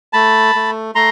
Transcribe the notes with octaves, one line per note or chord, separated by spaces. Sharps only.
A3 A5 B5
A3
A3 A#5 C6